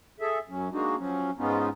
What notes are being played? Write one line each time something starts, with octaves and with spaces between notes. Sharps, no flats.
G#4 A4 E5
F#2 F#3 C#4
G#3 A#3 D4 D#4 F#4
F3 F#3 C#4
G#2 G#3 B3 C#4 D#4 F4